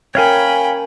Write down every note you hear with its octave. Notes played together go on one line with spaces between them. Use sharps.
C#4 A#4 C#5 F5 G5 G#5 B5